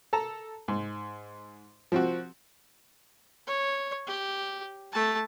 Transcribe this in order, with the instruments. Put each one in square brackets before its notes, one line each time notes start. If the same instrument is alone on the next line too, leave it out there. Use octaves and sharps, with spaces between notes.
[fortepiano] A4 A5 A#5
G#2
F3 C4 F#4
[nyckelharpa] C#5
G4
A3 A5